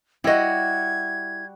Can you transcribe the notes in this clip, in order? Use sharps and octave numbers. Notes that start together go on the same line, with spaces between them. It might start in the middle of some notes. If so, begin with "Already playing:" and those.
G3 E4 F#4 D#5 G#6